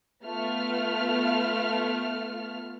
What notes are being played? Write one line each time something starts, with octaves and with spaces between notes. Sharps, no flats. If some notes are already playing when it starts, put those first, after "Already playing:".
A3 B3 F4 F6